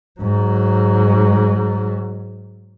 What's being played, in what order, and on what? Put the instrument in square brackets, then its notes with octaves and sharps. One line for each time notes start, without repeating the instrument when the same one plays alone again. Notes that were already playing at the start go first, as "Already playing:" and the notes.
[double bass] G#2 F#3